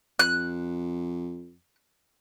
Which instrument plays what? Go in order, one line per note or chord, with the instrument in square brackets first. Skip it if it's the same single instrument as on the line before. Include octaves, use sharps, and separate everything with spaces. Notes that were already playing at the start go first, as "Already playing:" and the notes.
[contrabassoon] F2 [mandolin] F#6